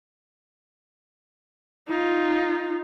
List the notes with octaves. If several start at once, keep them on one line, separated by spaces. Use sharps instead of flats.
D#4 F4